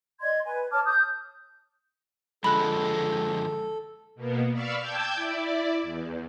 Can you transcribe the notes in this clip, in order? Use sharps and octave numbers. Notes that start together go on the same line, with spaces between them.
D5 D#5 C6 G#6
B4 G#5
C#5 A5 D6 F6
D#6 G6
D3 F3 G#3 A4 B5 F#6
B2 A#3 B3
D5 F5 B5 C#6 E6 F6
G5 A5 D6 E6 G6 G#6
E4 D5
E2